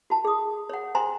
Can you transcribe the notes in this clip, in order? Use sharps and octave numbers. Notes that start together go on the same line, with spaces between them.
F#4 A5
G#4 D#6
C#5 F#5
C5 G5 G#5 A#5 C6